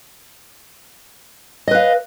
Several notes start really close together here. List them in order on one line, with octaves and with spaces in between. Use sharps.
D#5 B4 F5